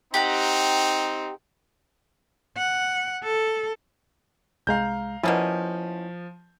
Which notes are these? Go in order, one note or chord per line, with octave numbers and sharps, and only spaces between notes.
C4 D#4 G4 F#5 A#5
F#5
A4
C2 G#3 F5 A#5 G6
B2 F3 A#3 C#4 E4